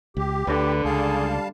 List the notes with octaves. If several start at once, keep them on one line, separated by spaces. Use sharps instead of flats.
C#2 G4
D2 D3 B4
C#2 G3 G#4 F5 A5